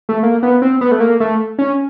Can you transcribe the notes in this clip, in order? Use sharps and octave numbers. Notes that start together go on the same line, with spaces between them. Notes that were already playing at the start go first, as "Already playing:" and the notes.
A3
A#3
B3
C4
B3
A3
A#3
A3
C#4